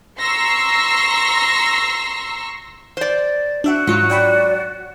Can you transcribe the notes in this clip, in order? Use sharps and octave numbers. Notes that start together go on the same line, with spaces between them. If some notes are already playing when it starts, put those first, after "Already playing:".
A#5 C6 C#6 E6 A#6
C5 D5
D4 F#4 E5 F#5
G#2 F#3 F4 C#7
D5 F#5 G5 B5